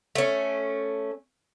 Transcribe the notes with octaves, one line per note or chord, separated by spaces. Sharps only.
A3 C#4